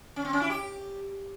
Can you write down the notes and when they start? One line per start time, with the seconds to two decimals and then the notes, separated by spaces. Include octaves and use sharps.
0.16 C#4
0.25 C4
0.33 C#4
0.41 E4
0.50 G4